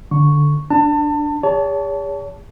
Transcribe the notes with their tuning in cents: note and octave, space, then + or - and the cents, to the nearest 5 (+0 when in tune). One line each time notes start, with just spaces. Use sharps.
D3 +0 C#6 +0
D4 +0 A5 +30
G#4 -45 C#5 +40 A5 +0